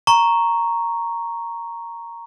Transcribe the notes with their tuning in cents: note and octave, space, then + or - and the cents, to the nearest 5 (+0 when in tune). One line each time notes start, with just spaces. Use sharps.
A#5 +0 C#6 +0